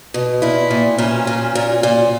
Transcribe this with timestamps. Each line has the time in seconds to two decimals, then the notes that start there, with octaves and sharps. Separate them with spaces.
0.14 B2
0.42 A#2 E4
0.71 A#2
0.98 A#2 C#4
1.27 A#2
1.55 A#2
1.83 A#2